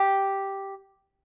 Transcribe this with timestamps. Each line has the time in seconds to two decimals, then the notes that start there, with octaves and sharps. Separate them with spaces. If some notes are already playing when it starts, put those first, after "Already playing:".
Already playing: G4